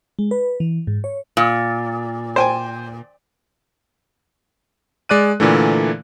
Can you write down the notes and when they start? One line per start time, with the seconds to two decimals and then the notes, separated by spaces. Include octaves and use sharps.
0.19 G#3
0.31 B4
0.60 E3
0.87 G#2
1.04 C#5
1.37 A#2
2.36 C5 G5 G#5
5.09 G#3 D5 F#6 D#7
5.40 A#2 D3 E3 A3